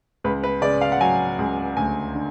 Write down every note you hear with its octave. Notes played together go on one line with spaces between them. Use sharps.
C#2 B4
B4
C#3 D5
F5
F#5
F#3 G#5
C#2
D2 G#5
D3